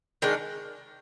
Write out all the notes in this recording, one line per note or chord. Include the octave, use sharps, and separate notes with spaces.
D#3 G#3 D4